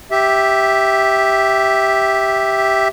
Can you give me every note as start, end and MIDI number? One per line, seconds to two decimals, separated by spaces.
0.11 2.88 67
0.11 2.88 76